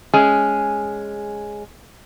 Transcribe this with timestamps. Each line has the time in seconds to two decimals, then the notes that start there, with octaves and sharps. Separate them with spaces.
0.14 G#3 C#4 G#4